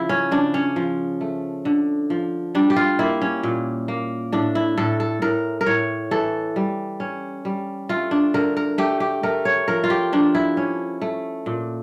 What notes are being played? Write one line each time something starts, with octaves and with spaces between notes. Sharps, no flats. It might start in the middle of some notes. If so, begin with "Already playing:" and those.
Already playing: C#3 F3 E4
C#4
C#3 D4
C#4
F3
A3
D3
F3
G3 D4
G4
F4
A#3 E4
C#4
A#2
A#3
A2 D4
E4
A2 A4
A4
A2 A#4
A#4
A2 C#5
E3 A4
G3
C#4
G3
A3 F4
D4
D3 A#4
A#4
A3 G4
G4
A3 A#4
C#5
F3 A#4
F4
G4
F3 D4
E4
C#4
A3
A#2